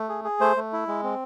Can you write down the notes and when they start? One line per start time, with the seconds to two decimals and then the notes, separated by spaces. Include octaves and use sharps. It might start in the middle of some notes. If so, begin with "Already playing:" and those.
Already playing: A3
0.09 G#4
0.24 G#4
0.40 A3 C5
0.56 A3
0.73 E4
0.88 G#3
1.03 C4